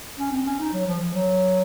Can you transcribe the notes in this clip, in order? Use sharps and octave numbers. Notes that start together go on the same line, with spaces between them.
C#4
C4
C#4
D#4
F#3
F3
F3
F#3